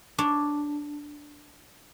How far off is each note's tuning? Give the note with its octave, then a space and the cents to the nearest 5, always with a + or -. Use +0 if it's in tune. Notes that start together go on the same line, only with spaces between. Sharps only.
D4 +0 C#5 +0